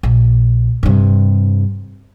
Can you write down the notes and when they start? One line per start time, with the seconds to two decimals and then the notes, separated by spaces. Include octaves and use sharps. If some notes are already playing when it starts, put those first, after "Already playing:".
0.03 A#1
0.83 G2 C3